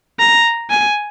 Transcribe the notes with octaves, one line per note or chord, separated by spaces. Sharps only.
A#5
G#5